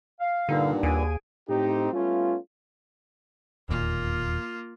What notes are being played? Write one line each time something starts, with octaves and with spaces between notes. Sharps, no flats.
F5
G2 A#2 D3 D4 D#4 G4
F#5
D#2 G#4 G#5 D7
A2 C4 D#4 G4
G3 A3 B3 C#4 F4
E1 D#2 A#2 A#3 F4